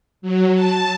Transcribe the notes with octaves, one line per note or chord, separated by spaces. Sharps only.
F#3
A5